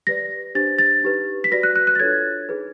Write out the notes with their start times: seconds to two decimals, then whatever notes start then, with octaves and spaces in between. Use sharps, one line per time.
0.07 G4 B4 D5 A#6
0.55 D4 G4 C5 A6
0.78 A6
1.03 D#4 G4 B4
1.44 B6
1.52 F#4 B4 D5 A#6
1.63 F#6
1.76 F#6
1.87 F#6
1.95 A6
1.99 D4 F4 A4 C#5 G#6
2.49 D#4 G#4 B4